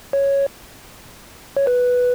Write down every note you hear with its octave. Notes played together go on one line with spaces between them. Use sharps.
C#5
C#5
B4